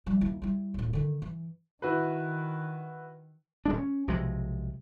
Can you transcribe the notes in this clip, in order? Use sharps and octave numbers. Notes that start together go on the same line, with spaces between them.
F3 G3
D#2 E4
G3 E4
D1 A1
D3 D#3
E3
D#3 E4 F#4 B4
D#1 G#3 D4
C#4
B1 C3 F3 G#3